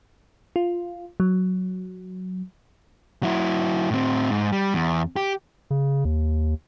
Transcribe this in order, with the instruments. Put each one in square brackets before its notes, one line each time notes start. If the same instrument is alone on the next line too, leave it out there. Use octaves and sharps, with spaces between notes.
[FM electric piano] F4
F#3
[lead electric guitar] F#3 E4
A2 C4
G#2
G3
E2
G4
[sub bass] C#3
D#2